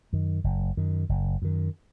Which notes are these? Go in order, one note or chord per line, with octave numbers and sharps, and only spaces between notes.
F#2 D#3
F#1
F#2 D#3
F#1
F#2 D#3